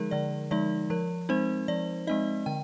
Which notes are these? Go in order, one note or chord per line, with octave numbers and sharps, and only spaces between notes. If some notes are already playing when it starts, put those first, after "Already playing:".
Already playing: D3 F3 G#3 D#4 G#4 A#4
D3 D5
F3 G#3 D#4 D5
F3 A#4
G#3 C4 D#4 C5
F3 D5
G#3 C4 D#4 D#5
D3 G5